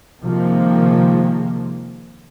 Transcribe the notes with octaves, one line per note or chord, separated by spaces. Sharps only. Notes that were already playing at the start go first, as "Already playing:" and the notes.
C3 D#3 F3 G#3 A#3